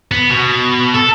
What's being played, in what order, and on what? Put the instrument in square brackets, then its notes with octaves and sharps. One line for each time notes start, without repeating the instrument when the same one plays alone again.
[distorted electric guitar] B3
B2
A4